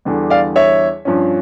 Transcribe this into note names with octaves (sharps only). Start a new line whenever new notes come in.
E2 D3 G3
D5 F5
C#5 E5
G2 F3 C#4